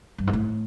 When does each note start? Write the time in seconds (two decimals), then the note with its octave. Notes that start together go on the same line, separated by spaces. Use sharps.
0.18 G2
0.27 G#2
0.33 A2